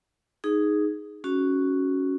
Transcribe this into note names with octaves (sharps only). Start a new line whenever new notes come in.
D#4 G#4
C#4 F#4